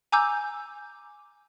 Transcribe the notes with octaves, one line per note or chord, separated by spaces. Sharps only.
G#5 A#5 D6 E6 G6